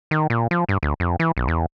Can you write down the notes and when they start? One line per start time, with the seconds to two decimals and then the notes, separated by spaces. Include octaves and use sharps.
0.11 D#3
0.30 A#2
0.51 F3
0.69 G2
0.83 D2
1.00 F2
1.20 E3
1.37 B1
1.48 E2